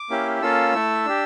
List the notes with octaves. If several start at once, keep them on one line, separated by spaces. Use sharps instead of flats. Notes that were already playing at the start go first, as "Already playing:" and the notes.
Already playing: D6
A#3 C#4 E4 G4
A#3 C#4 F4 A4 E6
A3 E4 A4
D4 G4